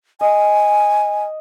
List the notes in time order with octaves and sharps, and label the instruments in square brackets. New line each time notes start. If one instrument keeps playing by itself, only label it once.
[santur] D#5 [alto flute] G#5